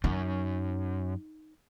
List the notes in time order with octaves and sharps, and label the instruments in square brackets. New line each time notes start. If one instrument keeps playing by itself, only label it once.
[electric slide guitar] F#2 [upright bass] D#4